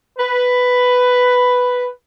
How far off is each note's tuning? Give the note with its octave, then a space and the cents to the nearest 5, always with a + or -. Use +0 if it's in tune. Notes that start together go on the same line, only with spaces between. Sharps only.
B4 +5